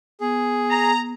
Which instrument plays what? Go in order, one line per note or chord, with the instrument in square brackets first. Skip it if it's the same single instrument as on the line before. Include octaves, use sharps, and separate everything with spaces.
[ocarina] B3 [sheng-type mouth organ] G#4
[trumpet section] A#5